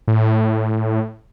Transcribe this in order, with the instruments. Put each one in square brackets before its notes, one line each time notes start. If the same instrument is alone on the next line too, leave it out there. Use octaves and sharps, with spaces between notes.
[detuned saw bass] A2